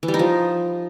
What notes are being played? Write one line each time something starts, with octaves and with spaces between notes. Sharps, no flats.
E3
G3
D#4
F3